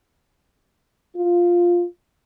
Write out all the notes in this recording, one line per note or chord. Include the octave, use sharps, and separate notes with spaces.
F4